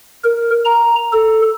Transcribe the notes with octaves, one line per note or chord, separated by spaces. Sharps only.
A#4
A#5
A4